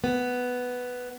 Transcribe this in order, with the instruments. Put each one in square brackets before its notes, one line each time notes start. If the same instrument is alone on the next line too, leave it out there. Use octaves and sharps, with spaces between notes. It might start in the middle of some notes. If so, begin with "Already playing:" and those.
[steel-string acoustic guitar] B3